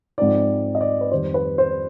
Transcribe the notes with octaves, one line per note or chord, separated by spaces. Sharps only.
G#2 F3 C4 D#4 D5
D#5
D5
B4
F2 D#3 G3 C5
B4
C5